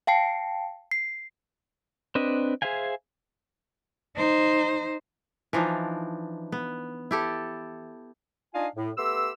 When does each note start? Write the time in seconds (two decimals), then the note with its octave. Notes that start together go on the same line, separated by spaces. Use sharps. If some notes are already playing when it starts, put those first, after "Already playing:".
0.07 F5 G5 A5 C7 C#7
0.91 C7
2.15 C4 D4 B4 D#5
2.62 G#4 C5 E5 F5 G#5
4.15 D#4 C5
5.53 E3 F3 D4 D#4
6.52 B3
7.11 E4 G4 A4
8.55 D4 D#4 F4 D#5 F5 G#5
8.77 A2
8.98 A3 B3 G4 C6 E6